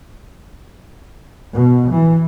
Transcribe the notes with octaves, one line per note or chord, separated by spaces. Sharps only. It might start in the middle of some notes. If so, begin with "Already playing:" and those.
B2
E3